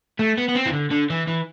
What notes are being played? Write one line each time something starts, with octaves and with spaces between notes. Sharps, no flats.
A3
B3
B3
C4
E3
D3
D3
E3
E3